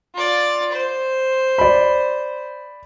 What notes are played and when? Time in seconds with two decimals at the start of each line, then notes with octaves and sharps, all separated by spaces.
0.14 F4 D5
0.72 C5
1.58 D5 B5